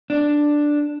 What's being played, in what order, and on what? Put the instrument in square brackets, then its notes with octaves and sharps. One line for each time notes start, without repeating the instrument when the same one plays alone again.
[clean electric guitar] D4